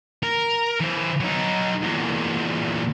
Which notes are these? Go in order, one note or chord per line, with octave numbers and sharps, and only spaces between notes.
A#4
E3 C5
F#3 D#4
E2 A#2